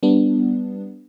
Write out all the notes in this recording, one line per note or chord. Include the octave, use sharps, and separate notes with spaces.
G3 B3 D4